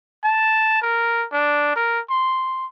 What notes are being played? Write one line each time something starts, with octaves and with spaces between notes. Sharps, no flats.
A5
A#4
D4
A#4
C6